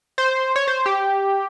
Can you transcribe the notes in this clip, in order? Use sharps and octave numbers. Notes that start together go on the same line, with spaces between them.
C5
C#5
C5
G4